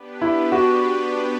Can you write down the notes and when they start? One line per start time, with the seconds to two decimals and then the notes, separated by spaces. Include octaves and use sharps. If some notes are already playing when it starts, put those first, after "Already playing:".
Already playing: B3 D4 G4 B4
0.22 E4
0.52 F#4